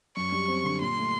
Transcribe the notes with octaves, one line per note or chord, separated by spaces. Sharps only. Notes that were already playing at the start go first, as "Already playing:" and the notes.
F#2 C#6
G3
C4
D3
A#2 C6
A3